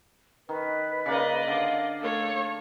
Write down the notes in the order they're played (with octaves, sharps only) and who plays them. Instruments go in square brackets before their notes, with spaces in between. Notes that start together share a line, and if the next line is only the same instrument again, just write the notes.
[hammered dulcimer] D#3 [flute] B4
[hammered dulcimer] C#3 A#3 [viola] D5 D#5
[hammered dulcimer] D3 [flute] F5
[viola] A3 C#5 [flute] F5